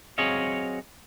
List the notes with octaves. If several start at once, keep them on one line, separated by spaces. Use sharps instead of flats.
F#3 C4 G#4 C#5 D#5 F5